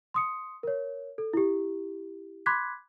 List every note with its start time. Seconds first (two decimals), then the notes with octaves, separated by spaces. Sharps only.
0.14 C6 D#6 C#7
0.63 A#4 C#5
1.18 A4
1.33 E4 G4
2.46 B5 C6 D6 F#6 G#6 B6